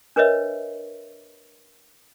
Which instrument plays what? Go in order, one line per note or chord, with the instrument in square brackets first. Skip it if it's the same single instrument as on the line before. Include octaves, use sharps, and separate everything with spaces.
[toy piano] D4 A#4 B4 C#5 D#5 E5